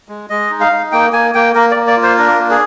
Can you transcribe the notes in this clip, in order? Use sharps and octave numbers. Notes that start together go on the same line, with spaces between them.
G#3
G#3 D#5
D#4
F5
D#4
A#3 G5
A#3 G#5
A#3 G5
A#3 A#4
A#3 D5
D5
F4
C5
D4 A#4
A#3
G#4